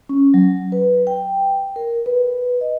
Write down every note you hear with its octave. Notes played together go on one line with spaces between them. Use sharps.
C#4
F#3
B4
G5
A#4
B4
D#5